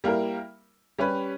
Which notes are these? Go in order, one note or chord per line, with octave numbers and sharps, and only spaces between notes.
G3 A#3 E4 A#4
G3 C#4 G4 B4